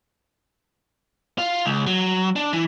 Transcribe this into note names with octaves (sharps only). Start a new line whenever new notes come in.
F4
C#2
F#3
D4
E3